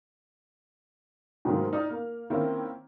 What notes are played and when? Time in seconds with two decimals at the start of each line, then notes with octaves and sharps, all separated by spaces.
1.45 G#2 C3 D#3 F#3 A3 A#3
1.73 D#4 D5 F6
1.91 A#3
2.30 D#3 A#3 C4 C#4 E4